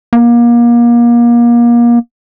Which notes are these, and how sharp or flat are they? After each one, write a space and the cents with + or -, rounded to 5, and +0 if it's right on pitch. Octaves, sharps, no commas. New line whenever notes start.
A#3 +30